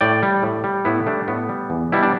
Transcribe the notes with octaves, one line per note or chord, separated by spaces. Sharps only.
A2 D5 G5
G3
A2
G3
A2 B3 E4
G3 A3 D4
A2 B3
G3
E2
B2 G3 E4
D4